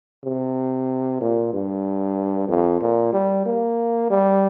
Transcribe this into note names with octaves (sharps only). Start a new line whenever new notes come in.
C3
A#2
G2
F2
A#2
G3
A#3
G3